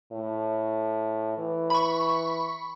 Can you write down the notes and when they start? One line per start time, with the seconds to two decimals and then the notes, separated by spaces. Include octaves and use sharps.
0.12 A2
1.38 E3
1.70 B5 C#6